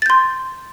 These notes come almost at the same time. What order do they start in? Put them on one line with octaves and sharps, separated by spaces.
A6 G6 C6